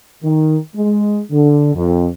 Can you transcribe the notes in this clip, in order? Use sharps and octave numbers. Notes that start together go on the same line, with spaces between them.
D#3
G#3
D3
F2